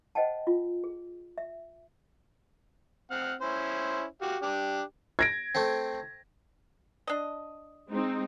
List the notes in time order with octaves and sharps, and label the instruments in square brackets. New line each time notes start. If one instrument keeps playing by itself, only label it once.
[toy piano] C5 D#5 F#5 G5 A5
F4
G#4
E5
[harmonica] C4 F#5 F6
C#4 E4 C5
F#4 G4 F5
D4 G4
[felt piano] G#6 A#6 D7
[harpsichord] A3 C4
[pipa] D4 D#5
[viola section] G#3 C4 D#4